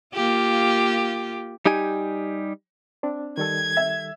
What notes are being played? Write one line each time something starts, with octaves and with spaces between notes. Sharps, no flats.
A#3 F4 G4
G3 D#4 G4 G#5
C4 D4
D#3 G3 A4 G#6
E5